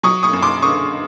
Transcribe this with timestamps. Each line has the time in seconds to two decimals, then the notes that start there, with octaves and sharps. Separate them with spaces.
0.03 F#3 C#6 D#6
0.23 C#6 D#6
0.33 F#2
0.42 C6 D6
0.62 D3 C#6 D#6